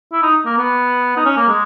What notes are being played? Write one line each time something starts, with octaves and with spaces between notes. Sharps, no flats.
E4
D#4
A#3
B3
D#4
C#4
A#3
G#3